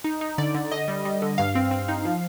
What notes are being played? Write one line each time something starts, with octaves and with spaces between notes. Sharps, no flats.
D#4
D#4
D3 D5
D3
D3 D#5
G3
G3
D3
G2 F5
C4
C4
D#4
F3